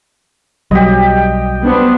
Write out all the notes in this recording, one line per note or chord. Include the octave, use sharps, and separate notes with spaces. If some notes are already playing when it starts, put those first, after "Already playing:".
B1 F#3 G3 G4 D#5
B3 C4 D4